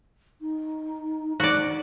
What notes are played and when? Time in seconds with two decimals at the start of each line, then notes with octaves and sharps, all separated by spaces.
0.41 D#4
1.40 D#4 F#4 D5